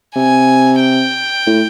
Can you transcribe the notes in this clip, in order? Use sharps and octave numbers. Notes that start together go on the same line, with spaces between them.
C3 G#5
G5
A2